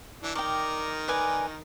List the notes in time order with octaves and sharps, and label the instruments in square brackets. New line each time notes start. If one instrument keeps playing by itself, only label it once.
[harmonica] E3 D4
[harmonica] D#3 A#4 D#5 [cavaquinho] D5 G5
[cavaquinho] B4 D5 G#5